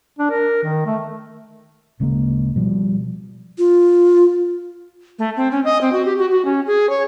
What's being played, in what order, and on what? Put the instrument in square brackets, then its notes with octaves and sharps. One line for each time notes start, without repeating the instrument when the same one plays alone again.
[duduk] D4
A#4
D#3
A3
[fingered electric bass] D1 C#3 G#3 A#3
B2 F3 G3
[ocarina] F4
[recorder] A3
C4
C#4
D#5
C4
F#4
G4
F#4
F#4
C#4
G#4
C#5